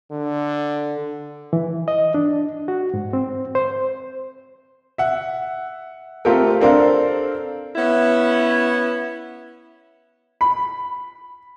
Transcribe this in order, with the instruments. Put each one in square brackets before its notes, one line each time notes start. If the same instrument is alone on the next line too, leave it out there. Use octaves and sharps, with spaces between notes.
[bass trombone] D3
[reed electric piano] E3
D#5
D4
F#4
G#2
C4
C5
[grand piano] E5 F#5
A3 C4 F4 G4 A4 A#4
C4 D4 A4 A#4 C5 F5
[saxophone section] B3 C#4 E4
[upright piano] B5